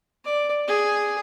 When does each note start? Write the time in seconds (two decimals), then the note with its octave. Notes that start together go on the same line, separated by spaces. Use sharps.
0.25 D5
0.68 G#4